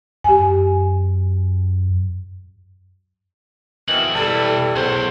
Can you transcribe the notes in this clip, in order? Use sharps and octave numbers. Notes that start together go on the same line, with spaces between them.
F#2 G4 G#5
B2 D#3 E3 C4 A4 F#7
B2 E3 G3 E4 A4
B1 E2 A2 C5 F#5 C#6 G#6